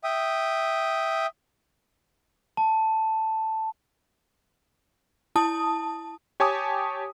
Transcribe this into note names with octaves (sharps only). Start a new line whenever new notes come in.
E5 G5 D#6
A5
E4 A5 D#6
G4 C#5 G#5 A5 D6 D#6